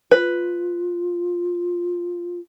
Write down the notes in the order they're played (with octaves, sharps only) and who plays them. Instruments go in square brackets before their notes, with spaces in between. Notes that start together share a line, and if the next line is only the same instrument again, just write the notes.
[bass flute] F4 [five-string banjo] B4